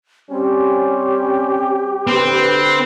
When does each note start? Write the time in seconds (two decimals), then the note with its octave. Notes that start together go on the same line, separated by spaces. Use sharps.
0.31 G3 C4 C#4 G4
2.07 D3 C4 B4